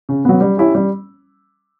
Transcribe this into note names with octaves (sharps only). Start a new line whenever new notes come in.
C#3
F#3 B3
G3
C#4 E4 G4
G3